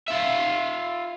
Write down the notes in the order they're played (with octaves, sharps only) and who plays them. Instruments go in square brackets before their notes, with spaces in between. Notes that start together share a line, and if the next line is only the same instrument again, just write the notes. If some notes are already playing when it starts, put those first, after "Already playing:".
[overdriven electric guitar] F4 E5